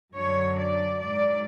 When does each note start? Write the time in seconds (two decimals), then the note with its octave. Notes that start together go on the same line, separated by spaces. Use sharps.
0.14 F#2 D3 F#3 C#5
0.57 D5
0.99 G#2 F#3 D5